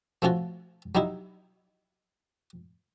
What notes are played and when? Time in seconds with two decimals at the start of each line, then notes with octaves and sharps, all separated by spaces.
0.22 F3 A3 C#4 F4 F#4
0.95 F#3 G3 D#4 E4